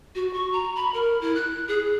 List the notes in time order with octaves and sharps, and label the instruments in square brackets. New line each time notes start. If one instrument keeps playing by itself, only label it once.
[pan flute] F#4
C#6
A#5
B5
A#4
E4
F#6
G#4